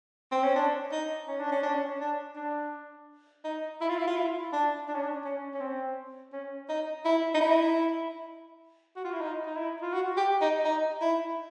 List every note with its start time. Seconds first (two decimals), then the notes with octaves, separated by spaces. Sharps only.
0.32 C4
0.43 C#4
0.56 D4
0.92 D#4
1.28 C#4
1.40 D4
1.52 C#4
1.63 D4
1.74 C#4
2.00 D4
2.36 D4
3.44 D#4
3.81 E4
3.89 F4
3.98 E4
4.07 F4
4.17 E4
4.53 D4
4.89 D4
4.95 C#4
5.03 D4
5.24 C#4
5.54 C#4
5.61 C4
6.32 C#4
6.69 D#4
7.05 E4
7.34 D#4
7.41 E4
8.96 F#4
9.05 F4
9.13 E4
9.21 D#4
9.46 D#4
9.57 E4
9.82 F4
9.93 F#4
10.17 G4
10.41 D#4
10.65 D#4
11.01 E4